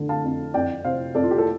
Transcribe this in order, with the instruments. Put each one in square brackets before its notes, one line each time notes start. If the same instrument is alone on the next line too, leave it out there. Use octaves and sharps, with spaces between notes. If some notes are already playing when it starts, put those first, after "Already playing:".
Already playing: [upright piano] D3
F5 A5
F2
F2 D5 G5
C3 C5 F5
F2 A4 D5
F4
G4
A4